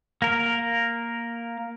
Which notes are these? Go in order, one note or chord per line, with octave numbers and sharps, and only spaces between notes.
A#3 A#4